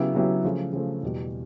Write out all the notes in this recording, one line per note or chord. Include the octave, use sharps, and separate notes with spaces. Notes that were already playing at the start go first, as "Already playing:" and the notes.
Already playing: C#3 F#3 B3 E4 G4
C#3 F#3 B3 E4 G4
C#3 F3 A3
C#3 F3 A3
E2 B2 G3